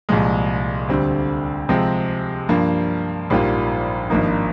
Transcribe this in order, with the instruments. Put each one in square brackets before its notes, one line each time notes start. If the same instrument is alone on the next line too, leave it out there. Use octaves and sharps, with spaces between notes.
[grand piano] C2 A#2 F3 G#3
D2 D3 G3 C4
C3 F3 G#3 C4
G2 F3 A#3
A#1 G#2 G3 A#3 F4
G#1 G2 F3 A#3 D#4